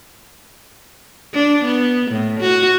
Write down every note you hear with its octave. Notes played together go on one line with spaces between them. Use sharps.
D4
B3
A2
F#4